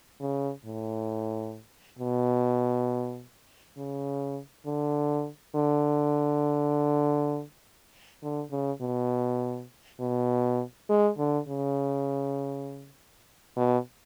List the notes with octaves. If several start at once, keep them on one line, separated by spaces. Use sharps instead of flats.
C#3
A2
B2
C#3
D3
D3
D3
C#3
B2
B2
G#3
D3
C#3
B2